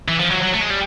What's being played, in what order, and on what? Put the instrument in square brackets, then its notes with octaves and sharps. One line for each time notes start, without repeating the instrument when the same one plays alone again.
[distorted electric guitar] E3
F3
F#3
F#3
A3
G#3
G3